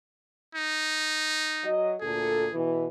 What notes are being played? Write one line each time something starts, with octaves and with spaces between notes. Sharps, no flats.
D#4
F#3 D#5
D2 A#2 G#4 A4
B2 E3